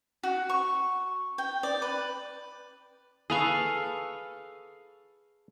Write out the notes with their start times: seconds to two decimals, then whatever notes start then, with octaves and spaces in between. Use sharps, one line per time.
0.23 F#4
0.49 C#6
1.38 G5
1.63 D5
1.82 B4
3.30 G#4 A4 B4 F5 C#6